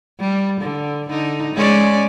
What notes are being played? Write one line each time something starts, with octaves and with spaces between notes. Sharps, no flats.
G3
D3
D3 D#4
G#3 C#4 D5